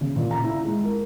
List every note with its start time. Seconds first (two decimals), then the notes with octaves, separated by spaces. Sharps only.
0.01 C#3
0.16 A#2
0.31 A#5
0.44 E4
0.65 G#3
0.84 A#4